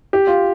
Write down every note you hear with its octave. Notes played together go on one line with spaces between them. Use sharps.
G4
F4